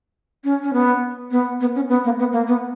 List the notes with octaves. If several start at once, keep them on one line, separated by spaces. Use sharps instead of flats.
C#4
C#4
B3
B3
B3
C#4
B3
A#3
B3
A#3
B3